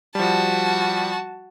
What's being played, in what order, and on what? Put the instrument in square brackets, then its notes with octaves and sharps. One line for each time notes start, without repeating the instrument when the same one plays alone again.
[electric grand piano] F3 G3 [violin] F#4 A5